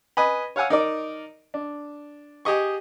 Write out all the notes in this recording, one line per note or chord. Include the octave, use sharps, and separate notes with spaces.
B4 D#5 G#5 B5
C#5 F5 F#5 G#5 E6
D#4 A#4 D5
D4
G4 G#4 D#5 C#6